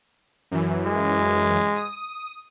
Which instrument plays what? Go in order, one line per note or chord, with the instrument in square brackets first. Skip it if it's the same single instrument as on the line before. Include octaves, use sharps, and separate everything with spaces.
[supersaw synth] F#2 E3
[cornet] G#3
[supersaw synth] D#6